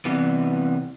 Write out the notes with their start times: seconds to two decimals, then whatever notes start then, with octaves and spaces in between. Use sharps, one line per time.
0.05 C3 E3 G3 B3